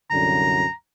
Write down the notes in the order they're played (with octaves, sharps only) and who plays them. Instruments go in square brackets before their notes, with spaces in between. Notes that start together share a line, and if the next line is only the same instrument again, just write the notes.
[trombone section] C2 F#2 D3 [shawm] A#5